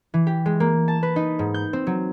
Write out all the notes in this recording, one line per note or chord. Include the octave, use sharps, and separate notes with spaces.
E3
G4
G#3
A#3
A5
B4
D#4
G#2
G6
C4
F#3